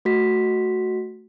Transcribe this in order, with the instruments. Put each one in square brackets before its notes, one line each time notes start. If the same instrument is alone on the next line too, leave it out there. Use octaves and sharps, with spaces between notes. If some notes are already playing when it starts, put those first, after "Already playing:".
[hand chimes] A3 F#4 B6